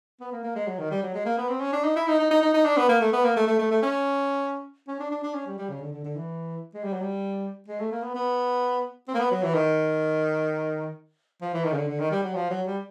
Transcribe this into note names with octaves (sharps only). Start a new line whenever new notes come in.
B3
A#3
A#3
G#3
F#3
D#3
G3
F#3
G#3
A#3
B3
C4
C#4
D4
D#4
E4
D#4
D#4
D#4
D#4
D#4
D4
B3
A#3
A3
B3
A#3
A3
A3
A3
A3
C#4
C#4
D4
D4
D4
C#4
G3
G3
C#3
D3
D3
D3
E3
G#3
G3
F#3
G3
G#3
A3
A#3
B3
B3
C4
A#3
B3
F#3
E3
D#3
F3
E3
D#3
C#3
D3
D3
D#3
G3
F#3
F3
F#3
G3